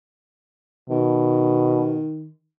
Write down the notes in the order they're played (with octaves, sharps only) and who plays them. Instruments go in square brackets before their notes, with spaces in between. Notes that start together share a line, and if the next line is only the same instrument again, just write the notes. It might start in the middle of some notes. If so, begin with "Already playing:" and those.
[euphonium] B2 [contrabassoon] D#3